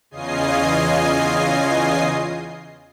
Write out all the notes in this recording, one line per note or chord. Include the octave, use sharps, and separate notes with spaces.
E2 C#3 F4 D#5 G#5 C7